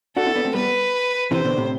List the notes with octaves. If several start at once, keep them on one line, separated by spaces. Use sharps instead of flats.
D4 F#4 A4
C4 E4
B3 D4
A3 C4
G3 B3 B4
C3 E3 C5
B2 D3
A2 C3